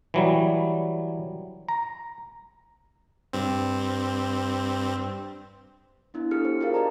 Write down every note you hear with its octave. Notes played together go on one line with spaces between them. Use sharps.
E3 F#3 G3
A#5
G2 C4
B3 D4 E4
D4 G4 A4 F6 C#7
C5
F4 G4 G#4 A#4 C5 F5
F4 G4 D5 D#5 A5 A#5